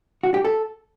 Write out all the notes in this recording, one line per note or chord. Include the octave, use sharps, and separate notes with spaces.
F#4
G4
A4